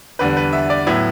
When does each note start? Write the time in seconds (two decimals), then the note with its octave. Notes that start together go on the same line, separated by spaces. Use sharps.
0.19 E2 D3 G3 B4
0.37 B4
0.53 E5
0.70 D5
0.86 A2 F#3 B3 E4